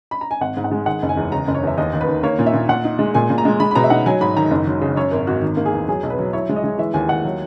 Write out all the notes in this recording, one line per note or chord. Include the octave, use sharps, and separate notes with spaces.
B5
A#5
G#5
G#1 F#5
G#2
F#5
G#3
D#3 F#5
F#1
G#5
E2
C#3 A#5
F#1
C#5
E2 E5
D#2 D#5
D#2
B4
D#3
A#3 C#5
A#2
E5
A#2
A#2 F#5
D#4
G#3
A#2 G#5
A#2
A#5
G#3
G#3 B5
B5
B2 A#5
E5
D#4 F#5
F#3 G#5
G#2 B5
D#3 A#5
F#1
F#3
C#3
F#2 C#5
G#1 A#4
G#1 F#4
D#3
A#3
G#4
E2
F#3 G#4
B1
B4
F#3
E4 C#5
G#3
D#5
G#3
E3 E5
D#2 G#5
D#2 F#5
F#3